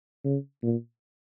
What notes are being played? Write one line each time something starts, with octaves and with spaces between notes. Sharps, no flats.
C#3
A#2